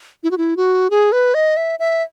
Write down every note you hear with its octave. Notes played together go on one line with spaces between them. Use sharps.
E4
F#4
E4
F#4
G#4
B4
D#5
E5
E5